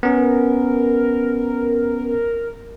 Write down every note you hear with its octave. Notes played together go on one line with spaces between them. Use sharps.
B3 C#4 A#4